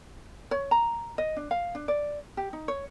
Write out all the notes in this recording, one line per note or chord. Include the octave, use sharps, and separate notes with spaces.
C#5
A#5
D#5
D4
F5
D4
D5
G4
D#4
C#5